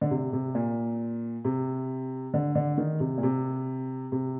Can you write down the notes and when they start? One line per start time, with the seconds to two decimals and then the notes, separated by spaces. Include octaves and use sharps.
0.01 D3
0.11 C3
0.33 C3
0.55 A#2
1.45 C3
2.34 D3
2.55 D3
2.78 D#3
3.00 C3
3.17 A#2
3.23 C3
4.12 C3